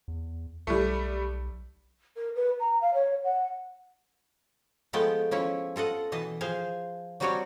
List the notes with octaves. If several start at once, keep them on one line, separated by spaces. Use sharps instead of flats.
E2
B1 G3 A3
A#4
B4
A#5
F5
C#5
F#5
F3 G#3 A3 B3 G5 A5
F3 C#4 E4 C#5
F4 A4 D#5 F#5
B2 E3 D#5 A5
F3 G#4 C5 F5 G#5
F#3 G3 C4 F#4 C#5 D5